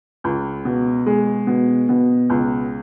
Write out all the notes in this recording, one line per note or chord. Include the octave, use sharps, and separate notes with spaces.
C#2
B2
G#3
B2
B2
C#2